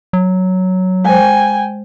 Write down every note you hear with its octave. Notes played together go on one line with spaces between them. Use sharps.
F#3
G#3 C5 G5 G#5